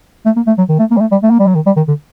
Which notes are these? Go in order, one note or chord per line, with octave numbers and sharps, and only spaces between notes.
A3
A#3
A3
F#3
D#3
A3
A#3
G3
A3
G3
A3
A#3
G3
F#3
D#3
G3
D#3
D3